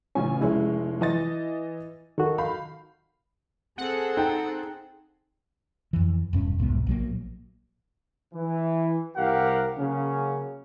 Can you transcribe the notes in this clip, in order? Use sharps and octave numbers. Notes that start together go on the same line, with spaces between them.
A1 C#3 C#4 G#5
F1 G#3 C#4 E4
E3 D#5 A6
D#3 F#4 A4
F5 B5 G6
C4 G#4 A4 F#5
D#4 G5
F2 E3
E1 G2 C#4
E1 C2 G#2 B3
A#1 F#3 A#3
E3
C2 G4 A#4 F5 F#5
C#3 F#3 A#3 C#4